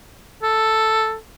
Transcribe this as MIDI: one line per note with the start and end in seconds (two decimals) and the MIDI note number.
0.43 1.16 69